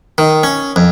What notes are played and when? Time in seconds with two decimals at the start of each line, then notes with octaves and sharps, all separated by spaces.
0.18 D#3
0.43 C#4
0.76 F2